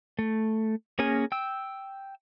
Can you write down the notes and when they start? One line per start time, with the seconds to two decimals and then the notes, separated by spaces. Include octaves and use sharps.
0.19 A3
0.99 A#3 C#4 G#4 A#4 G#5
1.32 G5 E6